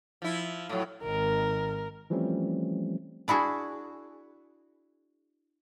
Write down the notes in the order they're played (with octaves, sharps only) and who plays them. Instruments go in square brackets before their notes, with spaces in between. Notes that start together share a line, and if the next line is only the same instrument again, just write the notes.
[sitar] F3 E4
A2 F#3
[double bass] G#1 D#3 [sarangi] A#4
[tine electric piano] E3 F3 G3 A3 C4 C#4
[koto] D4 E4 F#4 G#4